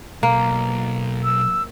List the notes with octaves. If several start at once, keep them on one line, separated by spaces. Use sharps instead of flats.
B1 A#3
E6